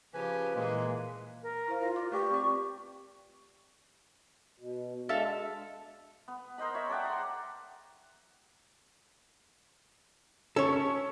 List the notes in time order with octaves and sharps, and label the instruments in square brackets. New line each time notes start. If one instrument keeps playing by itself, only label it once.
[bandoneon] C#3 F3 G#5 [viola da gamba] G4 [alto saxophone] B4
[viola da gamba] A#2 E3 G#4 [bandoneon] G#3 A#3
[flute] A#4
[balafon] E4 C5 F5
[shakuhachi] F4 [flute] A#4
[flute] D5 [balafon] D6
[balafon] A3 B4 D5 [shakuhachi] G4 [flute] C#6
[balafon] C4 D5
[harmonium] B2
[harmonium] G#3 D4 [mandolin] A4 E5 F5
[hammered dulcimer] B3
A#4 C5 D#5 B5
C#5 E5
A4 D5 F#5 G5
A#5 C6
[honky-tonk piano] C#4 [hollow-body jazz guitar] A4 C#5